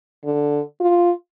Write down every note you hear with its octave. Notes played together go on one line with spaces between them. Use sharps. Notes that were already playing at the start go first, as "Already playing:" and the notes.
D3
F4